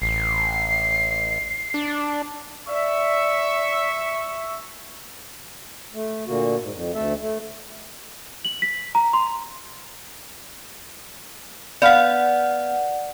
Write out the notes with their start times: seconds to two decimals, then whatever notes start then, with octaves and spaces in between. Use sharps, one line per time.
0.02 A1 C7
1.74 D4
2.68 D5 E5 C#6
5.94 A3
6.27 A#2 D3 A#3 F#4
6.60 G#2
6.72 F2
6.95 D2 A3 A4 E5
7.22 A3
8.45 F#7
8.62 B6
8.95 A#5
9.13 C6
11.82 B3 D5 F5 F#5